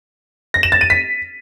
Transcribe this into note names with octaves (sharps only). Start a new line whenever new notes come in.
A#6
E7
A6
D#7
B6